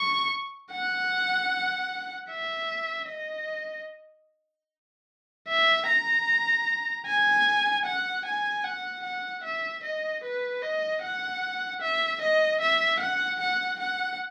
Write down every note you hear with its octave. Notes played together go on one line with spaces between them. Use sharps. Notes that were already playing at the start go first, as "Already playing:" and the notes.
Already playing: C#6
F#5
E5
D#5
E5
A#5
G#5
F#5
G#5
F#5
F#5
E5
D#5
B4
D#5
F#5
E5
D#5
E5
F#5
F#5
F#5